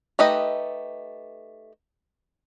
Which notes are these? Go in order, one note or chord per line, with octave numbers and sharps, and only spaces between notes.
A3 D#4 G4 B4 D#5